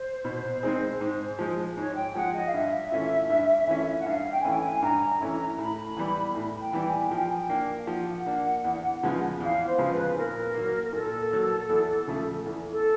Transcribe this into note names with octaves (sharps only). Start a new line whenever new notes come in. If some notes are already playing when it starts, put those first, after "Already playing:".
Already playing: C5
B2
G#3 C4 D#4 G#4
G#2
F3 G#3
G#2 C#5
G5
F3 G#3 F#5
D#5
F5
G2 E5
E3 A3 C#4 F4
G2
E3 A3 C#4 F4
F#5
G2 F5
G5
G#5
E3 A3 C#4 E4 G5
G#5
G2 A#5
E3 A3 C#4 E4
A2 B5
E3 G3 B3
A2
G5
E3 G3 B3
G#5
F3 G5
G#5
G5
A#3 D4
F5
F3 F#5
A#3 D4
E2
C#3 F3 G#3 B3
E2 F5
C5
C#3 F3 G#3 B3
B4
A#2 A#4
F#3 A#3
A#4
A#2 A4
F#3 A#3
E2
C#3 F3 A3
E2
A4